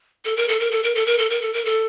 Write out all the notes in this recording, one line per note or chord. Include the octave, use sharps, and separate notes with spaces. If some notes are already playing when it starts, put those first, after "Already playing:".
A4
A#4
A4
A#4
A4
A#4
A4
A#4
A4
A#4
A4
A#4
A4